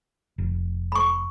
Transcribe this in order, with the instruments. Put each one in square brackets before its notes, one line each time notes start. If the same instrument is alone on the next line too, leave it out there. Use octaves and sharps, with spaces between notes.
[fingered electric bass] F1
[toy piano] B5 C#6